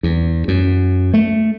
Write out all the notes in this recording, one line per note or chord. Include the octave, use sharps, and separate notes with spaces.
E2
F#2
A3